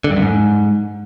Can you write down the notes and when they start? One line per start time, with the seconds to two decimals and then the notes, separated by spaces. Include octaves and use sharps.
0.04 D3
0.10 G2
0.16 F#2
0.22 G#2